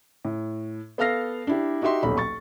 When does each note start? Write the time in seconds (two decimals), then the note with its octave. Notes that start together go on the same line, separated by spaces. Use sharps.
0.25 A2
0.98 B3 A4 F5 F6 A#6 C7
1.47 D4 E4 G4
1.82 D#4 F#4 G4 E5 C6
2.03 D#1 B1 F#3 B5
2.18 C#6 A6